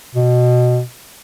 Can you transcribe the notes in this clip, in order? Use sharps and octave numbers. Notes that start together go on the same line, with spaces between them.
B2